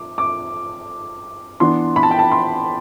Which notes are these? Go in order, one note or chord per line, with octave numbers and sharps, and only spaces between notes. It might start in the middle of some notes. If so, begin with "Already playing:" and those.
Already playing: D6
D6
E3 B3 D4 C6
B5
A5
G5
A5
C6